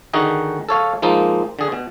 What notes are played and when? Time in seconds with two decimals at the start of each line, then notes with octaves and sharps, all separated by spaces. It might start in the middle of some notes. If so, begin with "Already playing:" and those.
0.13 D3 D#3 D#4 F#4 G#4
0.69 A4 C#5 F5
1.02 F3 G#3 A#3 D#4
1.59 D3 G#4
1.72 B2